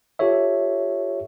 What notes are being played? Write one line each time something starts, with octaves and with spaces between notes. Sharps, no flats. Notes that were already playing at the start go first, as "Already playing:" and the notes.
F4 G4 A4 C#5 E5